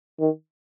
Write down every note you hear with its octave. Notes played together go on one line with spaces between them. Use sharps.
D#3